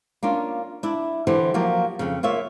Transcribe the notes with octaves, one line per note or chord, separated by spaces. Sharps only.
A#3 C#4 D4 F4
D4 E4
D3 E3 G4 C5
F3 F#3 A#3 G4
F2 C#3
A#3 F4 C#5 E5